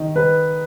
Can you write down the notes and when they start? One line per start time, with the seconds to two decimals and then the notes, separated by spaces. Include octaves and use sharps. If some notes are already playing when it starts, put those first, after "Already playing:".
Already playing: D#3 D#5
0.16 B4